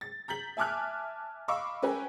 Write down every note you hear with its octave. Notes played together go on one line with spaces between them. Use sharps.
A6
A#5 G6 B6 F#7
E5 G#5 A5 D6 F6 F#6
D#5 F5 B5 C#6 D6 E6
C#4 A#4 B4 C#5 G5 G#5